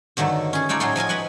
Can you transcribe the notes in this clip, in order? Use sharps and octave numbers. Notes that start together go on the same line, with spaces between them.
G2 D3 D#3 F#3 A3
C#4 G#4
A3 D#4 F4 C#5 D5
A2 F#3 F4 G#4 C6
F3 D#5 F5 G#5
B4 D#5 F#5 G#5